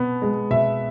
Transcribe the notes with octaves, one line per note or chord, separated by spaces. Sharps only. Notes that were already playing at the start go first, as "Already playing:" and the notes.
Already playing: B2 B3
G#3
B2 E5